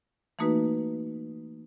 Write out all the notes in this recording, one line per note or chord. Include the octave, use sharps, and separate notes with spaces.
E3 A3 A#3 D#4 F#4 B4